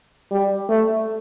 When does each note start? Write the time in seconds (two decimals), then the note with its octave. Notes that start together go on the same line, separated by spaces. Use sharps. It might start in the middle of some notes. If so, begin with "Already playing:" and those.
0.31 G3
0.69 A3